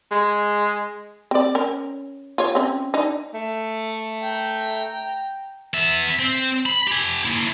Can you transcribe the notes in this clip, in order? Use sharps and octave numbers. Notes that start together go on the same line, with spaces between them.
G#3
C4 D5
C#4 A#4
F4 C#5
C4 C#4
D4 D#4
A3
G5 A#5
B3 E5
C4
B5
G4 G#5
A#3 E4